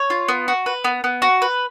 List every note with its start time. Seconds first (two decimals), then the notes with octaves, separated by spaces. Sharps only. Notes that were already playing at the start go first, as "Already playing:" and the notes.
Already playing: C#5
0.10 F4
0.28 B3
0.48 F#4
0.66 B4
0.84 B3
1.04 B3
1.22 F#4
1.42 B4